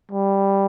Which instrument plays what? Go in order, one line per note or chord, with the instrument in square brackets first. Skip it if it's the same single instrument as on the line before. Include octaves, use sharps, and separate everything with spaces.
[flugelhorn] G3